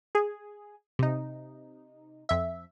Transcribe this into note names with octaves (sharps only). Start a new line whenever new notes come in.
G#4
C3 D#4
F2 E5